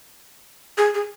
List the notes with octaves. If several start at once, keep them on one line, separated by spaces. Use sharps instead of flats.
G#4
G#4